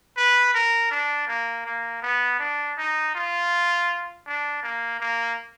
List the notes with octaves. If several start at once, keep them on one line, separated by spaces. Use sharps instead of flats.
B4
A#4
D4
A#3
A#3
B3
D4
D#4
F4
D4
A#3
A#3